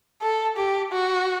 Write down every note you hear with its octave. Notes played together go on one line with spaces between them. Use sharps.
A4
G4
F#4